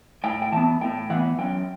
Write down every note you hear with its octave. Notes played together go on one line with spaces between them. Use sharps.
A2 G5
G5
E3 B3 A5
A2 G5
E3 B3 F#5
F#2 G5